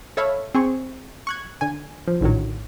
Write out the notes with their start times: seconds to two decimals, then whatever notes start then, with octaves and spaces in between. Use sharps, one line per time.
0.17 A4 C#5 E5 F5 B5
0.55 C4 G#4 C#6
1.27 C#6 F#6 G#6
1.61 D3 G#5
2.08 F3
2.21 A#1 A2 D3 D#3 F#3